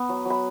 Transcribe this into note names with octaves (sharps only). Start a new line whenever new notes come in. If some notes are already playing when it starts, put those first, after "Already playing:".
Already playing: B3 B5
F#3
F#3 B5